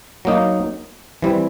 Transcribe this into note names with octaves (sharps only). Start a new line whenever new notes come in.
F#3 A#3 D#4
E3 G3 C4